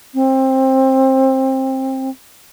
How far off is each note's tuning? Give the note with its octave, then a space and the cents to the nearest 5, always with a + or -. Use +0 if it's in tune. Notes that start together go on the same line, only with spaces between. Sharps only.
C4 +20